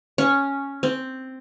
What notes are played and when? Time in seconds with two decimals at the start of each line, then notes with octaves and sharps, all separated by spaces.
0.18 C#4
0.83 C4